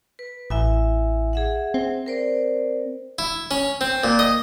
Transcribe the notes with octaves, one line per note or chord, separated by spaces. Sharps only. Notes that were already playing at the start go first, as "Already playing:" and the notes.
B4
A1 E4 E5 G#5
G#4 E5 F#5
C4
A#4 C5 D5
E4
C#4
C4
A#2
D#5